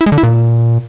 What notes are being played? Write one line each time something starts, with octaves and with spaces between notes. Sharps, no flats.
E4
G#3
D3
E4
A#2